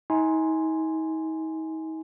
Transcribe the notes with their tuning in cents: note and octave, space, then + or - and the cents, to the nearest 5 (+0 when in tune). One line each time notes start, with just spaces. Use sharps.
D#4 +40 G#5 +0 C6 +0